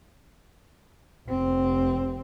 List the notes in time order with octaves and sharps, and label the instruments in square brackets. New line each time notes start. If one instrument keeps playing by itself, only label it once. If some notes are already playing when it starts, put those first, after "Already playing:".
[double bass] F1 C4